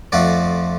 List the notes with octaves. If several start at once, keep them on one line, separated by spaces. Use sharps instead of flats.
F2 F3 A3 D5 F#5